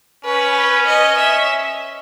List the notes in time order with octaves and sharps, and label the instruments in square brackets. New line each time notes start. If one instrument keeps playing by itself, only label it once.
[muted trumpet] C#4 [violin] B4
[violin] D#5
E5